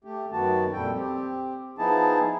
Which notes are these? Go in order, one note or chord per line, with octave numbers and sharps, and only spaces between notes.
A3 G4
F#2 D#3 B3 F#4 A5
F2 A#2 G3 A4 G5
C4 G4
F3 B3 D#4 E4 G#4 A5